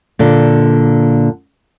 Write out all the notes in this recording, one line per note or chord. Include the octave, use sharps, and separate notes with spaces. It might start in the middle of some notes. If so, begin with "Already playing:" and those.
A#2 D3